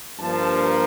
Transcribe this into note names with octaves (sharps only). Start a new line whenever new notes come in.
G2 F3 A#3 A5